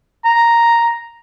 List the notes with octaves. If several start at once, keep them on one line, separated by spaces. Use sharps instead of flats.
A#5